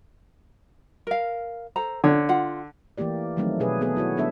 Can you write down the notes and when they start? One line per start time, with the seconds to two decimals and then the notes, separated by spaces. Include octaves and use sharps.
1.07 A#4 F5
1.76 A4 C5 A#5
2.04 D3 C#5
2.29 F4 F#5
2.98 E3 A3 A#3 G4 D5
3.37 D#3 F3 F#3 A3 C4 D#4
3.60 B2 G#4 B4
3.81 B3 G#4 A4
3.95 F#3 E4 F#4 C#5
4.17 G3 B3 D4 A4 E5